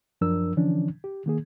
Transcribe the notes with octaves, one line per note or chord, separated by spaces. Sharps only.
F#2 F3 D4 A#4 E6
D3 E3 F3 C#4 D4
G4
D#3 A#3 G#4